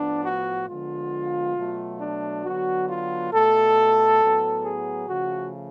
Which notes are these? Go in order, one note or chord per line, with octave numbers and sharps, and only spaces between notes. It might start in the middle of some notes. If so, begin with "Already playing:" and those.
Already playing: A2 F3 B3 D4
F#4
D3 F3 G#3 B3 F4
B2 F#3 A3
D4
D3 F#3 B3 F#4
F4
B2 A3 A4
A2 F#3 B3
G#4
C#3 F3 A3 F#4